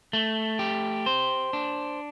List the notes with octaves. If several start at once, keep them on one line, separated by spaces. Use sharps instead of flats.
A3
G4
C5
D4